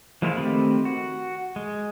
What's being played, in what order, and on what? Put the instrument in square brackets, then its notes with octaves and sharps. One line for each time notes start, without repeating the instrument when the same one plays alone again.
[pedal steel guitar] F3 G#3 A#3 E4 F4
D#3 A3 C4 G4 B5
F#4
G#3